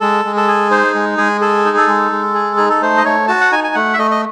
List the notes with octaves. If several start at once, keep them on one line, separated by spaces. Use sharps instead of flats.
G#3 A4
G#3
A4
G#4
D#4 C5
G#3
G#3 G#4
G#4 A4
D#4
A4
G#3
G#3
G#4
D#4 G#4
A4
A3 C5
D#5
A3 C#5
F#4 A5
F#5
D#4 G#5
G#5
A3 F#5
E5
A3 D#5
D#5